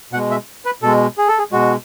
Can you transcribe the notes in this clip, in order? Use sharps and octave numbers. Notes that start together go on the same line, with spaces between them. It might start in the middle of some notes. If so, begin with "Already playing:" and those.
B2 G#3 F#5
E5
B4
B2 G#3 A4
G#4
A4
G#4
B2 G#3 F#4